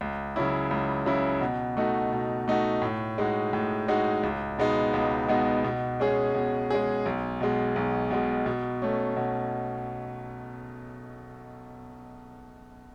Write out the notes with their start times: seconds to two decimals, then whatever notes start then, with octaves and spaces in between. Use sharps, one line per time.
0.01 C#2
0.36 C#3 F#3 C#4 E4
0.71 C#2
1.06 C#3 F#3 C#4 E4
1.41 B2
1.77 A3 D#4 F#4
2.12 B2
2.48 A3 D#4 F#4
2.82 A2
3.18 G#3 D#4 F#4
3.53 A2
3.88 G#3 D#4 F#4
4.23 C#2
4.58 B2 G#3 B3 D#4
4.94 C#2
5.29 B2 G#3 B3 D#4
5.64 B2
6.00 G#3 C#4 G#4
6.34 B2
6.71 G#3 C#4 G#4
7.06 B1
7.41 B2 G#3
7.76 B1
8.11 B2 G#3
8.46 B2
8.82 A3 C#4
9.16 B2